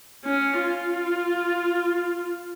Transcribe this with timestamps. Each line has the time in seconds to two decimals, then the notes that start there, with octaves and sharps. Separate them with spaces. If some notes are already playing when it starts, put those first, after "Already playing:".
0.25 C#4
0.62 F4